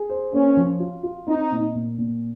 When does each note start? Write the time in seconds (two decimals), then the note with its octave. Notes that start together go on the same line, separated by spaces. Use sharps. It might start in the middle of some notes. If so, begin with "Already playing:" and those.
Already playing: G#4
0.09 C5
0.33 A#3 C#4
0.57 F3
0.80 F4
1.03 F4
1.27 C4 D#4
1.51 A#2
1.74 A#2
1.98 A#2